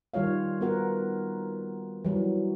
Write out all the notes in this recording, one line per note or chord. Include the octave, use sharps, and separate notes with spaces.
D#3 G3 F4 C#5 F5
B3 F#4 A#4 F#5
E3 F#3 G3